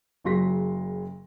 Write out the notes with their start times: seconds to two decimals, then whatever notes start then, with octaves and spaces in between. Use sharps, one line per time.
0.24 F#1 C#3 F#3 C6 A#6 B6